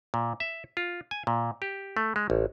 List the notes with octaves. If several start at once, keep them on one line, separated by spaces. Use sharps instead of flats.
A#2
E5
F4
G#5
A#2
G4
A3
G#3
A1